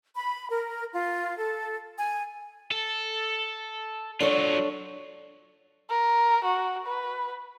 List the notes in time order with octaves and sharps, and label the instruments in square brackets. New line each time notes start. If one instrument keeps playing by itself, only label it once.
[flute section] B5
A#4
F4
A4
G#5
[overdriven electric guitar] A4
[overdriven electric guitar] F#3 F4 [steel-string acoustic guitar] D4 A4 C#5
[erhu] A#4
F#4
B4